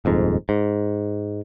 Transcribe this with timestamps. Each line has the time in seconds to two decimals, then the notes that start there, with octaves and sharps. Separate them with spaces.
0.05 D#1 F2 G#2
0.49 G#2